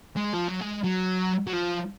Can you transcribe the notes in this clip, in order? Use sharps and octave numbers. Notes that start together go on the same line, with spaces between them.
G#3
F3
F#3
G#3
F#3
F#3
F3